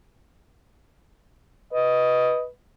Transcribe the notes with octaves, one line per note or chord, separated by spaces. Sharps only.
B4 D#5